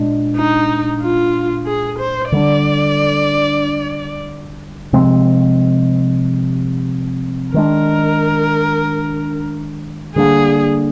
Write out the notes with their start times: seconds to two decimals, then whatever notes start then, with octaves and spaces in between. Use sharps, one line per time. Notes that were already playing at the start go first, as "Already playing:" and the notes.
Already playing: A#2 G#3 D4
0.36 D#4
1.01 F4
1.66 G#4
1.99 C5
2.32 D3 G3 D4 D5
4.93 C3 F3 G#3 C4
7.54 D#3 G#3 D4 A#4
10.16 D3 G3 A#3 D4 G#4